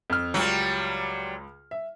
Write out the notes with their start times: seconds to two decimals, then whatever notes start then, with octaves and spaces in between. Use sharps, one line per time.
0.10 F2 F6
0.34 C#2 F#3 G3 F4
1.71 E5